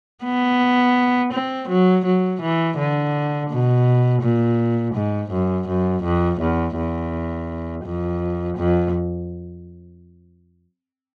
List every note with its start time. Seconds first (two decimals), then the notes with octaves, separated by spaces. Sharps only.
0.24 B3
1.33 C4
1.69 F#3
2.05 F#3
2.41 E3
2.78 D3
3.50 B2
4.23 A#2
4.95 G#2
5.32 F#2
5.68 F#2
6.04 F2
6.41 E2
6.77 E2
7.85 F2
8.58 F2